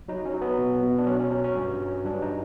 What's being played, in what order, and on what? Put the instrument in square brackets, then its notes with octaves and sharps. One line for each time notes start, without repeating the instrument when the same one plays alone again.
[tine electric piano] F#3 D#4
C#4
F#3
B3
B2
B2
D4
F#3 C#4
C#4
F#3 C#4
C#4
G2
F#3
G2 D4
D#4